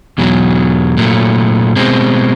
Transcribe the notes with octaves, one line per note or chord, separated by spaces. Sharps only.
E2 B2 F#3
A#2 F#3 A3
B2 G#3 C4